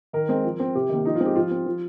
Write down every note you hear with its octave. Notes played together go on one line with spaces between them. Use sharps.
D#3 A#4
G#3 C4
F3
C4
C3 G4
D#3 A#3
F3 D#4
F4
G#3 C4
G4
F3 F4
C4
F3